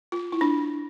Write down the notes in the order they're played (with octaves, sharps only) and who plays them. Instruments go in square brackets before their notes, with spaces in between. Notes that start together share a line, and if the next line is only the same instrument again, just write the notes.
[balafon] F4
E4
D4